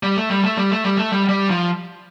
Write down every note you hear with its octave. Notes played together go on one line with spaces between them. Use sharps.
G3
A3
G3
A3
G3
A3
G3
A3
G3
G3
F3